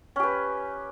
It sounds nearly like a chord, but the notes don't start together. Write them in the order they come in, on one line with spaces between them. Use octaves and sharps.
C#4 G4 B4